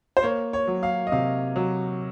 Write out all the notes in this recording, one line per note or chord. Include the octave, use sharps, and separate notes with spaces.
C5
A#3 C#5
C#5
F#3
F5
D#5
C3 F5
F#3